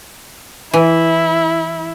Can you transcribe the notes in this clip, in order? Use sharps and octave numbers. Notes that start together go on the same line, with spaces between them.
E3 E4